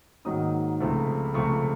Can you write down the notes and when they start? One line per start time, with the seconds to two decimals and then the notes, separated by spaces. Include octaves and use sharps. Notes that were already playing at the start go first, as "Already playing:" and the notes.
0.25 G#2 D#3 F#3 A#3 D#4 D#6
0.80 C#2 C3 F3 A3
1.34 C#2 C3 F3 A3 C#6